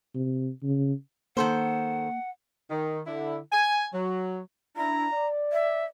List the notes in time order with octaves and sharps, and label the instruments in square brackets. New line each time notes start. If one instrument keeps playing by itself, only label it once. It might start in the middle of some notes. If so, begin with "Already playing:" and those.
[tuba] C3
C#3
[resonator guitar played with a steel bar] D#3 A4 C5 [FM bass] A#3 [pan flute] F#5
[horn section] D#3
D3 E4
G#5
F#3
[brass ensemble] D4 E4 [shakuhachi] A#5
[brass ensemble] D5
[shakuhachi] E5